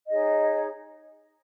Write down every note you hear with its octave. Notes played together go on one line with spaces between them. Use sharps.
D#4 G#4 C#5 D#5